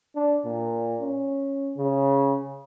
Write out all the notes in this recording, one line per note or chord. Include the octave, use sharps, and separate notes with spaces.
D4
A#2
C#4
C#3